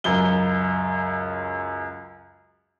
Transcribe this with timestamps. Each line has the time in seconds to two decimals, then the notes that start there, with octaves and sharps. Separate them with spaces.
0.04 C#2 F#2 G7